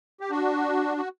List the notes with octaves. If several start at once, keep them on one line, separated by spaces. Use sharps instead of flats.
G4
D4 F#4
F#4